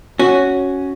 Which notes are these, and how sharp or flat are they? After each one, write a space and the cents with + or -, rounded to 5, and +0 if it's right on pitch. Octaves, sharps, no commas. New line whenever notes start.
C#4 +0 F#4 +0